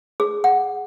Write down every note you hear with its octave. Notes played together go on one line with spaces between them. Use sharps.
G#4
F#5